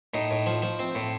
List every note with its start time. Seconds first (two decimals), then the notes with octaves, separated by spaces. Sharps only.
0.14 A2 D#4
0.31 A2
0.47 F3
0.62 F3
0.79 C4
0.95 A2